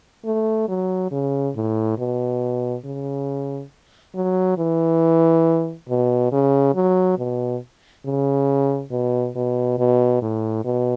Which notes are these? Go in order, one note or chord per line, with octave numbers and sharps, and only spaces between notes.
A3
F#3
C#3
A2
B2
C#3
F#3
E3
B2
C#3
F#3
B2
C#3
B2
B2
B2
A2
B2